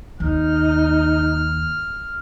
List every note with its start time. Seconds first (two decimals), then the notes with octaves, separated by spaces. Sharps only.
0.20 D#2 D#4 F6